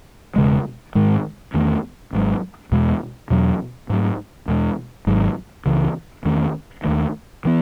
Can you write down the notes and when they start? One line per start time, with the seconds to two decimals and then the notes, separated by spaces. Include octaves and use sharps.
0.36 E1 E2 C#3 G#3
0.95 G#2 D#3 G#3
1.54 E2 D#3 A3 C#4
2.13 G#1 G#2 F#3
2.72 E2 B2 G#3
3.30 E2 B2 F#3
3.90 G#2 F#3 A3
4.48 E2 B2 G#3
5.07 G#1 G#2 F#3
5.66 C#2 C#3 E3
6.25 E2 D#3 A3 C#4
6.84 D#2 D#3 A3
7.45 E3 B3